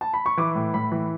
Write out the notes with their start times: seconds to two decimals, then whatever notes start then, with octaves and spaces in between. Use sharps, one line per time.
0.01 A5
0.14 B5
0.26 C#6
0.37 E3 D6
0.55 A2
0.74 A2 B5
0.92 E3